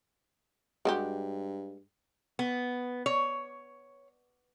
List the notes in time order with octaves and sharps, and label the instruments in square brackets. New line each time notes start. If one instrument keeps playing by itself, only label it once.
[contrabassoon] G2 [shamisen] G#3 F#4 G4
[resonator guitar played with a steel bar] B3
C#5